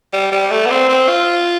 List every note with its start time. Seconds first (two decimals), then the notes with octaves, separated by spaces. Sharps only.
0.13 G3
0.32 G3
0.51 A3
0.66 B3
0.70 C4
0.89 C4
1.08 F4